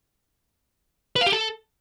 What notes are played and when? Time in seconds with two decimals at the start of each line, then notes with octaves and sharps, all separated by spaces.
1.16 B4
1.21 F5
1.27 G4
1.32 A4